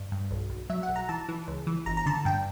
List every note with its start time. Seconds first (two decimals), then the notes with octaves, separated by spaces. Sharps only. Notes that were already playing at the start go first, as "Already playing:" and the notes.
Already playing: G2
0.12 G2
0.31 B1
0.50 B1
0.70 F#3 E5
0.83 F#5
0.89 B1
0.96 A#5
1.09 E3 A5
1.29 E3
1.48 C#2
1.67 E3
1.86 G1 A#5
1.97 A#5
2.06 D3 A5
2.25 G2 G5